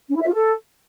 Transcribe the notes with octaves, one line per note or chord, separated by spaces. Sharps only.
C#4
E4
E5
F4
A4